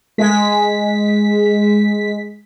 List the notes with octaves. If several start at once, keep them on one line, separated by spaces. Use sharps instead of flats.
G#3 B6